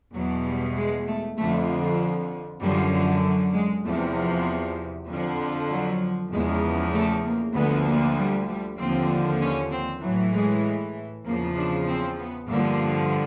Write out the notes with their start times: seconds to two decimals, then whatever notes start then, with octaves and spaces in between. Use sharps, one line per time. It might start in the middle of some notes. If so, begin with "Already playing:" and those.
0.15 E2 B2 F#3
0.46 G3
0.76 G#3
1.07 A3
1.38 F2 D3 F3 A3
2.62 F#2 D3 F3 G3
2.92 F3
3.23 F#3
3.54 G#3
3.85 E2 C3 F3 A3
4.16 F3
5.08 F2 D3 F3
5.70 F#3
6.32 E2 C#3 F3 G#3
6.94 A3
7.25 A#3
7.55 D2 D3 F3 B3
7.87 A#3
8.17 G3
8.48 G3
8.79 D#2 D3 F3 C4
9.41 C#4
9.72 C4
10.02 A2 E3 F#3
10.34 G#3
11.26 E2 C#3 F3 A#3
11.57 D4
11.88 C4
12.19 B3
12.50 G2 D3 F3 A#3